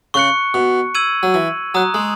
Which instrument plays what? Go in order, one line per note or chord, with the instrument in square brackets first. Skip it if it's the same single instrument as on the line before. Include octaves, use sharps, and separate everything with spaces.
[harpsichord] C#3 [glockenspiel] C#6 F#6 C#7
[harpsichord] B2
[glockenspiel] E6 G#6 D#7 F#7
[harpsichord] F#3
E3
[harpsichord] F#3 [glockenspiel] A#5 D#6 F#6
[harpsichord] G#3